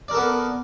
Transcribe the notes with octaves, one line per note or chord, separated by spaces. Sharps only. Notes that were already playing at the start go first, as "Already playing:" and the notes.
B3 A4 A#4 D5